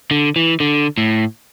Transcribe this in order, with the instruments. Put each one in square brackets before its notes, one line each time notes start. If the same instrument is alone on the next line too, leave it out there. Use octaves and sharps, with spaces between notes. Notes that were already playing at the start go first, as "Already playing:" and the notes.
[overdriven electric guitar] D3
E3
D3
A2